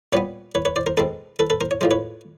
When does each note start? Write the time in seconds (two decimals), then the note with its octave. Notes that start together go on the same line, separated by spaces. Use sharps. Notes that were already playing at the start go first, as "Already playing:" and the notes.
0.13 A#2 G3 B3 B4 C#5
0.55 B4 C#5
0.65 B4 C#5
0.76 C5 D5
0.86 A#4 C5
0.97 B2 G#3 C4 A4 B4
1.39 A4 B4
1.50 A4 B4
1.61 A#4 C5
1.71 C#5
1.81 A2 F3 G#3 C5
1.91 B4 C#5